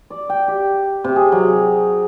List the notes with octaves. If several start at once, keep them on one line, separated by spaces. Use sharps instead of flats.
D5
G5
G4
C3
G#4
F#3